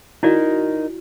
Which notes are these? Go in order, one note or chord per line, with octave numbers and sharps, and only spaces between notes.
D#4 E4 F#4 A#4 D5